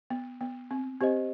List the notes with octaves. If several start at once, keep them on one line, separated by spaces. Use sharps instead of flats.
B3
B3
C4
C4 G4 C5 D#5